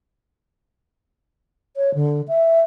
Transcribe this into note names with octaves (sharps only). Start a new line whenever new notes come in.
C#5
D3
E5